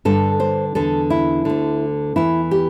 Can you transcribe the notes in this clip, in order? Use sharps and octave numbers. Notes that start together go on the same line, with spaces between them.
G2 D3 A4
C5
E2 D3 A4
E4
D2 D3
E2 E3 E4
G4